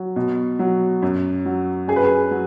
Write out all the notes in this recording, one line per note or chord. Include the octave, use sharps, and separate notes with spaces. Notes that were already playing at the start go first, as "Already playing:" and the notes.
Already playing: F#3
B2
F#3
F#2
F#3
F#2 G#4
B4
G#4
F#3